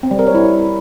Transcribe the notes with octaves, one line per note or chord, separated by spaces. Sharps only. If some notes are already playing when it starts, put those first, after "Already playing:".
C4
G3
A#4
C#5
E4